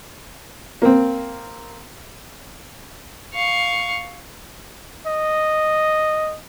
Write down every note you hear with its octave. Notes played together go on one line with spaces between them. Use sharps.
A#3 C4
F5 C#6
D#5